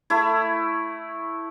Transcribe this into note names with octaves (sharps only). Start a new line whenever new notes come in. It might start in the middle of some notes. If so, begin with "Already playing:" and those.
A3 E4